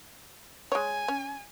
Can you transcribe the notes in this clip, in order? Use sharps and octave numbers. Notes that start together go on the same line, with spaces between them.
G#3 C#5 G#5
C#4